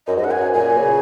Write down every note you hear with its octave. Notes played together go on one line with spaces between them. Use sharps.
F#2 D#5
G#2 D#5
F#5
F#2 G#5
A#2 G#5
C#3